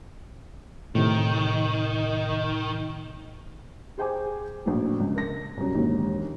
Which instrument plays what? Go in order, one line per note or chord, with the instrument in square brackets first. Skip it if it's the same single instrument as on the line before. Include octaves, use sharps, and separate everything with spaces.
[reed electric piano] A2 C3 [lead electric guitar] D#3
[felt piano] G#4 C5 G5 G#5 D6
A#1 A2 F#3
C#2
A#4 A#6
C2 F#2
E1 A#1 D#2 G#2